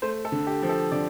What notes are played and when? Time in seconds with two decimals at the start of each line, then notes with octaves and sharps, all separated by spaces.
0.02 A3 C5
0.25 A4
0.32 D3
0.47 G4
0.63 F3
0.69 A4
0.92 D3 D5